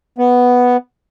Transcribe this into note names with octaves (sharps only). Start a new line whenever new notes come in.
B3